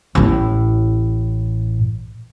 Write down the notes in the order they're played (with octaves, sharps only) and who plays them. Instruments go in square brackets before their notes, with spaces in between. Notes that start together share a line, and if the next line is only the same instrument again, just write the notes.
[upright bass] A1 A2